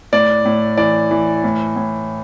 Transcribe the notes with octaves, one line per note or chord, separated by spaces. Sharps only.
A2 D5
A2
E3 D5
E3
A2
A2